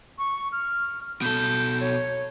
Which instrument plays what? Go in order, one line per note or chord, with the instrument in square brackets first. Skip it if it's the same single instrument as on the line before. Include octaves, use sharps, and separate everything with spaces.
[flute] C#6
F6
[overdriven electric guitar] B2 A4 [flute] G6
[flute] C#5